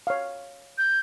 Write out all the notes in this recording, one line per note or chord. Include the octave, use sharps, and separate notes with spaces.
C#5 F5
G6